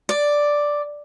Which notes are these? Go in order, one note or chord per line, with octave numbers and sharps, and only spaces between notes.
D5